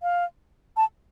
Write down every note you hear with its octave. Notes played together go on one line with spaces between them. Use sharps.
F5
A5